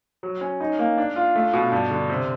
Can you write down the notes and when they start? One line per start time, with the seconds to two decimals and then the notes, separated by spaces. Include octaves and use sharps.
0.23 F#3
0.41 C#4
0.60 D#4
0.79 A#3
0.98 D4
1.16 F4
1.35 A3
1.53 B2
1.72 G2
1.91 D3
2.10 C3